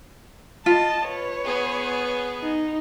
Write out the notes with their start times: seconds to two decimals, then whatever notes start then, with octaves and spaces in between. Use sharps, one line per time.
0.66 F4 D#5 A5
1.08 B4 C#5
1.44 B3 G#4
2.42 D#4